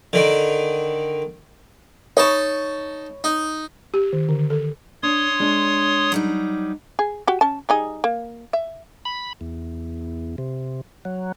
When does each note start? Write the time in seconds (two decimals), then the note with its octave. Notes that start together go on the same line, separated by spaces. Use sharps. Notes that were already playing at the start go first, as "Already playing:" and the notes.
0.13 D3 D#3
2.17 D#4 C#5 A5 B5 C#6
3.24 D#4
3.94 G4
4.13 D#3
4.29 D3
4.50 A4
5.03 D4 C#5 C6 D#6
5.40 G#3 D4
6.12 F#3 G3 D#4
6.99 G#4
7.28 F#4 G4
7.41 C#4 A5
7.69 G3 D#4 G#4
8.04 A#3
8.53 E5
9.05 B5
9.41 E2
10.38 C3
11.05 F#3